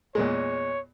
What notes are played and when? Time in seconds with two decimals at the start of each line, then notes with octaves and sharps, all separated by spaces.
0.15 E2 A#2 G#3 C#5